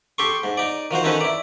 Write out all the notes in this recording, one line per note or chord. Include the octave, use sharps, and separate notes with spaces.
G4 A4 C6 C#6
G#2
D#4 D5
D#3 F3 F#4 C5
D#3 C#4 D#4 A4 B4
E4 D5